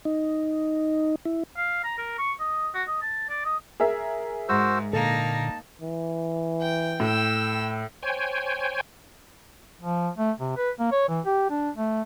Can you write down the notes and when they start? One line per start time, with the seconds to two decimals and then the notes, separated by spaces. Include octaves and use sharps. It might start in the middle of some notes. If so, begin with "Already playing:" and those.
0.05 D#4
1.25 E4
1.57 F5
1.84 A#5
1.98 A#4
2.19 C#6
2.40 D#5
2.74 F#4
2.88 D#5
3.02 A5
3.29 D5
3.45 D#5
3.80 G#4 A#4 E5
4.48 G#2 F#4 C5 E6
4.93 A#2 D3 A#3 D#4 A5
5.82 E3
6.61 G5
7.00 A2 G5 E6
8.03 C5 C#5 G5 G#5
9.81 F3
10.18 A3
10.40 C3
10.57 B4
10.79 A#3
10.92 C#5
11.09 E3
11.25 G4
11.50 D4
11.76 A3